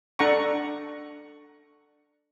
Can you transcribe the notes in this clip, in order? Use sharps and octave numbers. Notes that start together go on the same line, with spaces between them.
D4 A4 F#5 A#5 C#6